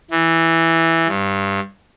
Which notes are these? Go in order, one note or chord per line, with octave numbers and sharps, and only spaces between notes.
E3
G2